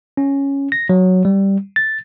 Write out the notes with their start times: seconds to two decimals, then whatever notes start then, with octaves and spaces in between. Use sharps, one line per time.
0.17 C#4
0.72 A#6
0.89 F#3
1.25 G3
1.76 A6